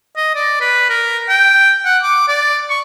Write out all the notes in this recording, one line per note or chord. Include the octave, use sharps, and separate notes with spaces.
D#5
D5
B4
A#4
G5
F#5
D6
D5
C#6